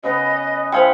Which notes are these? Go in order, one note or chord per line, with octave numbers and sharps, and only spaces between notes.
C#3 B3 B4 D#5
G#3 E4 C5 F5 G5